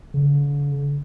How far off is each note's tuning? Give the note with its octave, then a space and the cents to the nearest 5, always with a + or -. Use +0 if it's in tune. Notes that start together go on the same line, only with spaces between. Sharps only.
D3 -45